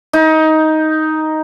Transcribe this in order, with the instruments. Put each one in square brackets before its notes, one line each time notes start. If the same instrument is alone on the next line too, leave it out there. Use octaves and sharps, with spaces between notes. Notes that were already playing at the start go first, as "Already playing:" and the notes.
[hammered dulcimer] D#4